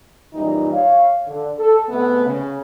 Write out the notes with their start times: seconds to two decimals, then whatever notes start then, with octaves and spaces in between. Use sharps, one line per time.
0.33 F#2 A#2 E3 G3 D#4
0.73 C#5 F5
1.26 D3
1.58 A4
1.89 C3 G#3 A3 B3
2.26 C#3